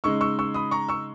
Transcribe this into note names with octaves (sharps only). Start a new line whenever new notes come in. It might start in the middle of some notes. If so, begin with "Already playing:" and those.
C#3 G#3 D#4 C#6 E6
C#6 E6
C#6 E6
B5 D#6
A#5 C#6
C#6 E6